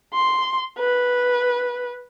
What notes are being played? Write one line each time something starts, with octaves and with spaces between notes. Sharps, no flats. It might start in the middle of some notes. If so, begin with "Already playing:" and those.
C6
B4